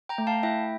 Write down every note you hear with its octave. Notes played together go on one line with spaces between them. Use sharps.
G5 A#5
A3
F5 A5
E4 E5 G5